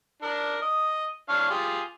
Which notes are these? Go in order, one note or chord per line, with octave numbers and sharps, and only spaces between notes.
D4 A#4
D#5
D4 C#5 F5
F4 G4 G#4